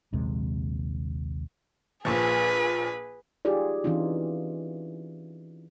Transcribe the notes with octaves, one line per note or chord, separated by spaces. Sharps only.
A#1 D#2 C3 G#3
A#1 A#2 F3 G#4 B4
D#4 F4 G4 G#4 D5
E3 C4 C#4 D#4 F4